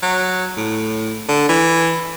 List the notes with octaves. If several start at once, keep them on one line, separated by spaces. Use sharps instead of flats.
F#3
A2
D3
E3